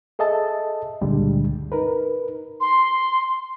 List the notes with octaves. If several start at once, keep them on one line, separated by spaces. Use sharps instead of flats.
G#4 A4 D#5 E5 A5
C#2 G2 A#2 D3 G3 G#3
D#4 A#4 B4
C6